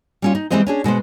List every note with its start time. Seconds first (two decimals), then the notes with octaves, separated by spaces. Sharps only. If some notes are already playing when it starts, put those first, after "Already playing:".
0.22 G3 C#4 F4
0.35 D#4
0.50 E3 G3 G#3 C4 C5 D#5
0.67 C#4 D4 G#4
0.84 B2 G#3 B3 C5